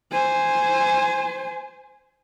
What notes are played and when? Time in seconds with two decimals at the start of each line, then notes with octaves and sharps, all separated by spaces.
0.12 C5 G#5